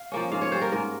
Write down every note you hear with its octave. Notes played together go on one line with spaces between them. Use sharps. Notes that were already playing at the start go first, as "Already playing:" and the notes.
Already playing: F5
F3 A#3 C#4
G#2 F5
C#5
G3 C#4 C5
A#4
G#2 A#4